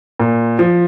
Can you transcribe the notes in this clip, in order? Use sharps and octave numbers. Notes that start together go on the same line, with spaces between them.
A#2
F3